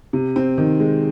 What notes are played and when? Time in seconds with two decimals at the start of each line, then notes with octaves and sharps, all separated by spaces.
0.13 C3
0.36 C4
0.58 D#3
0.80 G#3